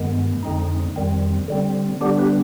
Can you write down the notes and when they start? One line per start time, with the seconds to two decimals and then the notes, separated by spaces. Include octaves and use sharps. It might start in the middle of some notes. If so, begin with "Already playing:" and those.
Already playing: G2 D#3 G#3 B3
0.43 F2 D3 G#3 C4 D#4
0.96 F2 D#3 G3 C4
1.48 D3 G3 C4
2.01 D3 G3 B3 D4 G4
2.18 G4 B4